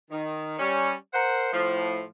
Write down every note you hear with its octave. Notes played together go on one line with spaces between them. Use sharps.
D#3
G3 C#4
A#4 C5 F#5
A2 F3